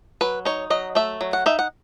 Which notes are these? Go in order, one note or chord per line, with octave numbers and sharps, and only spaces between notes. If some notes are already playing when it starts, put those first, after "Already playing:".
F#3 B4
D#4 C#5
F#3 D#5
A3 E5
F#3
F#5
D#4 E5
F#5